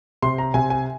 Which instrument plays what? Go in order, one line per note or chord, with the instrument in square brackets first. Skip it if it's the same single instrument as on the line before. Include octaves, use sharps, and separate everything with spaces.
[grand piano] C3 C6
A#5
C3 G#5
G#5